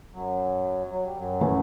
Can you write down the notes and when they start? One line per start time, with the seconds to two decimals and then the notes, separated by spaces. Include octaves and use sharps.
0.14 F#2 F#3
0.91 F#3
1.05 G3
1.18 F#2 F#3
1.41 E3 A3 C#4